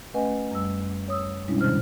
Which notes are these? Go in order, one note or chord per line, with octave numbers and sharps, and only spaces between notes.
A3 C#4 B4 D#5 F#5 G#5
F#2 G3 E6
C#5 D#6 E6
B2 G3 G#3 C#4 D4 E4
G#2 C3 D#3 C5 F6